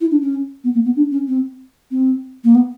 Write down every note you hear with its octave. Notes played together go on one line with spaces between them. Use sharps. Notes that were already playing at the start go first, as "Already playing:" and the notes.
E4
D4
C#4
B3
A#3
B3
D4
C#4
C4
C4
A#3
B3